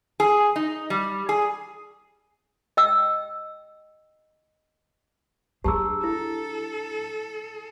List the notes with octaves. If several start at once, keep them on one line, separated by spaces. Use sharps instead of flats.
G#4
D#4
G3
G#4
D#5 G5 E6
F#3 D4 G4 G#4 A5 A#5 E6
E4 A4